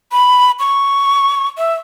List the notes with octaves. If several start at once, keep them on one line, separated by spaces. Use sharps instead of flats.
B5
C#6
E5